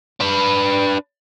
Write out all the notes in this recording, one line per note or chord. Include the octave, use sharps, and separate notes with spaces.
D4 B4